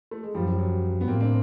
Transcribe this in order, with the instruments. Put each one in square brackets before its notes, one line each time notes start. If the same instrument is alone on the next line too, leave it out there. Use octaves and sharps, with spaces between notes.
[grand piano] A3
G#3
[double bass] F#2 [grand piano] F3 G3
[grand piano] F3
F#3
B3
[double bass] A2 [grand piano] A#3 C4
[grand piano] C4 D4